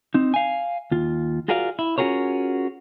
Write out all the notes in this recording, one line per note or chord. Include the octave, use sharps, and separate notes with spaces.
C4 D#4
F5 G#5
D#2 F4
F4 F#4 G#4 A#4 D5 F5
E4
C#4 F4 F#4 G#4 A#4 C#5